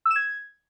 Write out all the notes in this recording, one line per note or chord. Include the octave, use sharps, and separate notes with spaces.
E6
E7
G#6